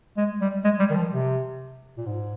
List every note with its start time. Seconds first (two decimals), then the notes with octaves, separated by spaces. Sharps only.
0.17 G#3
0.41 G3
0.64 G#3
0.80 G3
0.90 D#3
0.96 F3
1.12 C3
1.98 A#2
2.06 G#2